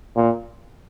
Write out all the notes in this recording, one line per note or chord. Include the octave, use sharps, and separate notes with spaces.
A#2